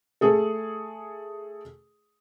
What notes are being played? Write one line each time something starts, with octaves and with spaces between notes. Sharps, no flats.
A3 G#4 A4